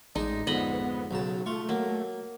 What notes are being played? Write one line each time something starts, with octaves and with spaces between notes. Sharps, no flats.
A1 G#3 D4 D#4
F2 G#2 D3 B3 D#5 B5
B1 C#3 F#3 A5
A3 F4 C#6
F#3 A#3